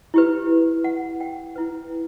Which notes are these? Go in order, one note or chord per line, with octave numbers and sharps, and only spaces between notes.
E4 G4 B4
F#5
G5
E4 B4